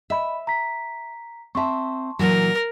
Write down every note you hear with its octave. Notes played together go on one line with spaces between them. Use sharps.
D#5 E5 B5
A#5 B6
C4 E5 A5 C6 C#6
A#2 E3 F#3 A#4